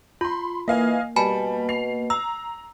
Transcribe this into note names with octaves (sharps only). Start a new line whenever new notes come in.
F4 B5 C6
E3 A#3 D#5 F5 G#5
B2 G3 G#5 A5 B5
C7 F7
A#5 E6